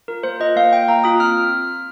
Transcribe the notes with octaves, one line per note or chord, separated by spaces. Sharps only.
F4 A#4
A#3 C5
F4 D#5
A#3 F5
F4 G5
A#3 A#5
F4 D#6
C4 F6